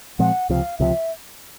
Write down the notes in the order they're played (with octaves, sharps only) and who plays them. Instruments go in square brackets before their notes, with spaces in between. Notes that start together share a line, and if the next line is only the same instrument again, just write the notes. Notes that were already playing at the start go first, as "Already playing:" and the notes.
[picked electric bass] A#2 F3 G#3 C4 [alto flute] F#5
[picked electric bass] C#2 C3 F3 [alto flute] F5
[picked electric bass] C#2 C3 F3 [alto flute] E5